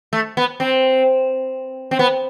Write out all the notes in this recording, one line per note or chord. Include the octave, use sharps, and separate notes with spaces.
A3
B3
C4
C4
B3